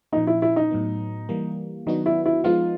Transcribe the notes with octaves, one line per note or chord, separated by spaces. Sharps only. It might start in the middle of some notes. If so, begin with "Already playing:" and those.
A#2 F3 A#3 D#4
E4
E4
D#4
A2 F#3 B3
E3 G3 A#3
D#3 F#3 B3 D4 D#4 F#4
E4
E4
F3 G#3 B3 D#4 F4